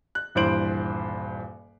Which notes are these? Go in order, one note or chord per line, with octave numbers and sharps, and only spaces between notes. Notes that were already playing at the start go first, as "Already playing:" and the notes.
F#6
D#1 G2 E3 C5 D7 F#7